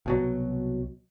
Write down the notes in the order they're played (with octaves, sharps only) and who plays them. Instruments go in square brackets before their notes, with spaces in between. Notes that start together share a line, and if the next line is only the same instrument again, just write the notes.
[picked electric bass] C2 B2 F#3